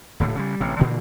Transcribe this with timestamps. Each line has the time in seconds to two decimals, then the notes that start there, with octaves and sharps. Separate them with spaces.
0.20 D#1 A2 D3
0.36 C#3 E3 G3
0.60 A1 C3
0.79 A#2 D3 E3 A#3